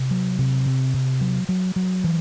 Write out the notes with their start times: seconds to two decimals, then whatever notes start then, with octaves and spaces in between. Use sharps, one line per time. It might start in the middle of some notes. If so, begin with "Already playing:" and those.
Already playing: C3
0.11 F#3
0.39 C3
0.66 C3
0.94 C3
1.21 F#3
1.49 F#3
1.76 F#3
2.04 E3